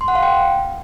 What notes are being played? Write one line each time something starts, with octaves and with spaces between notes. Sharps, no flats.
C6
F#5
F5
G5